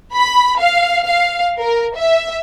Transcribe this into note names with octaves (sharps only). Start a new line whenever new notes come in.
B5
F5
F5
A#4
E5